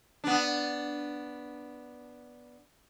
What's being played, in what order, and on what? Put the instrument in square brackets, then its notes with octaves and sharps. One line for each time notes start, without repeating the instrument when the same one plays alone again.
[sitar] B3 D4